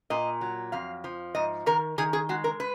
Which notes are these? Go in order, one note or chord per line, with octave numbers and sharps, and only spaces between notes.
A#2 D#5
F#3
F2 F5
F3
G#2 D#5
D#3 A#4
D#3 G#4
G#4
G#3 F#4
A#4
B4